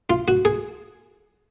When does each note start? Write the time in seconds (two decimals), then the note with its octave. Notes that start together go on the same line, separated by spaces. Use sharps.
0.10 F4
0.28 F#4
0.45 G#4